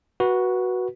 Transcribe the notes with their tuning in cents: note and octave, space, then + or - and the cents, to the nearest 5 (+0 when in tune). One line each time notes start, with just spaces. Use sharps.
F#4 +0 B4 -20